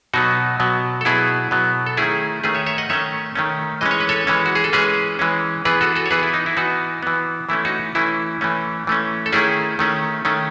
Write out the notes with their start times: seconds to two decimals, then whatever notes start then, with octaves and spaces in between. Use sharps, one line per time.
0.13 B2 F#3 B3 D#4 F#4
0.60 B2 F#3 B3
1.01 A4
1.05 B2 F#3 B3 E4 G#4
1.51 B2 F#3 B3
1.86 A4
1.97 D#3 A3 C#4 E4 G#4
2.43 D#3 A3 C#4 G#4 B4
2.55 C#5 E5
2.66 C#5 E5
2.78 D#5 F#5
2.90 D#3 A3 C#4 C#5 E5
3.35 D#3 A3 C#4
3.81 E3 G#3 C#4 D#5
3.91 C#5
4.00 B4
4.09 A4 C#5
4.27 E3 G#3 C#4
4.46 F#4
4.55 G#4
4.64 A4
4.73 E3 G#3 C#4 G#4 B4
5.19 E3 G#3 C#4
5.65 E3 B3 G#4 B4
5.81 F#4 A4
5.96 F#4 A4
6.06 C#5
6.11 E3 B3 G#4 B4
6.23 E4
6.34 D#4
6.46 E4
6.57 E3 B3 D#4 F#4
7.03 E3 B3
7.49 E3 A3 C#4 E4
7.65 D#4 F#4
7.95 E3 A3 C#4 E4
8.41 E3 A3 C#4
8.87 E3 A3 C#4
9.26 A4
9.32 D#3 A3 C#4 E4 G#4
9.79 D#3 A3 C#4
10.25 D#3 A3 C#4